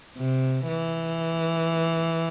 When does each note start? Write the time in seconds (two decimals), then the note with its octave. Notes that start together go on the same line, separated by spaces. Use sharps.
0.17 C3
0.68 E3